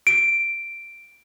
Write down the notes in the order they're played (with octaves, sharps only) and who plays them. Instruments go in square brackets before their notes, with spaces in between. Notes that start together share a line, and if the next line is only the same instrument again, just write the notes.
[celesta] D7